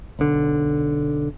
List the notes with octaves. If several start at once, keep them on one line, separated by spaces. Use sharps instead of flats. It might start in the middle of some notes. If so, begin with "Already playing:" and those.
B1 D3